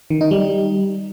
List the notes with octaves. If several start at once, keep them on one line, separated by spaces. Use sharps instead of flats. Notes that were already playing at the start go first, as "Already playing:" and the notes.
D#3
D#4
G3